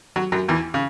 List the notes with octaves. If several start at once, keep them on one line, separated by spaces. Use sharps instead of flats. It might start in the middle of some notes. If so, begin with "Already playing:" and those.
F#3 F#4
F#2 F#3
E2 E3
C#3